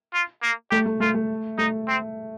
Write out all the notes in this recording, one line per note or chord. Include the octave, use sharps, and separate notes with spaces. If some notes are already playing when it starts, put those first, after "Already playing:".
F4
A#3
A3 G4
A3
A3 F4
A3
A3 D#4
C4